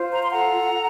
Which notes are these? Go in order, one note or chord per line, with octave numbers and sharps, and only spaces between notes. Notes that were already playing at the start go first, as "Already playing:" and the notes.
Already playing: F4 C5
A#5
C6
A4 F#5 A#5